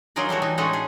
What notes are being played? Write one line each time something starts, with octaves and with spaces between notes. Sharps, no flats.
F#3 D#4 F4 G#4 A#4 D5
G3 A3 E4 F#4
E3 D#4
A2 G#3 A3 C#4 D#4 F#5
G#4